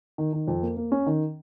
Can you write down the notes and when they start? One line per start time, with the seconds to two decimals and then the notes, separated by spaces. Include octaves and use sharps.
0.18 D#3
0.33 D#3
0.48 F2
0.62 A#3
0.77 A#3
0.92 C#4
1.06 D#3